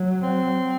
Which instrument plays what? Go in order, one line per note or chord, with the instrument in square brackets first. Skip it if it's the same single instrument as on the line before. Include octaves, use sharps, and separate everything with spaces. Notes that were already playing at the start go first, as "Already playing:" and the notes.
Already playing: [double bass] F#3
[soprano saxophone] C4